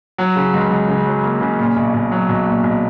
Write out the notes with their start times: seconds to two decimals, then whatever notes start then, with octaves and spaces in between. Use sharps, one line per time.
0.18 F#3
0.36 C#3
0.54 C#2
0.70 C#2
0.88 C#3
1.06 F#3
1.24 A#3
1.41 C#3
1.59 A#2
1.76 B1
1.93 B1
2.11 F#3
2.29 B1
2.46 A#2
2.64 B1